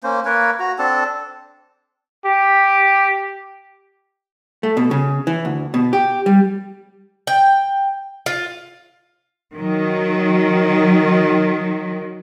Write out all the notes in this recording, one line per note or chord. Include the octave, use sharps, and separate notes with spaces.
A#3 C#4 C5
A#3 A#4 B4 C#5
F#4 A#5
C4 D4 A4 A5
G4
A3
B2
C#3
E3
D2
B2
G4
G3
G5
F4
D#3 F#3